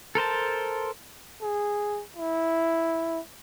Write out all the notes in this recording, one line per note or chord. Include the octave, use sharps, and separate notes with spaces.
A4 A#4 C5 A5
G#4
E4